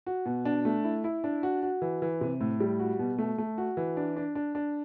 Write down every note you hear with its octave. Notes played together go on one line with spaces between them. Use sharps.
F#4
B2
D4
A3
E4
E4
D4
F#4
F#4
E3
E3
C3
A2
G3
F#4
B2
A3
A3
F#4
E3
D4
D4
D4
D4